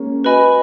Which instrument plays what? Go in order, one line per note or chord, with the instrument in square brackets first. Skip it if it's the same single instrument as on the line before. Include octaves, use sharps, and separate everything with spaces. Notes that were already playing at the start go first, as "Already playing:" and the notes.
Already playing: [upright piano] G#3 A#3 C#4
[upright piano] F#4 [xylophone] B4 D#5 G#5 B5